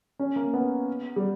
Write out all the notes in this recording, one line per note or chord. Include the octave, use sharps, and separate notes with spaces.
C#4
A#3
B3
G3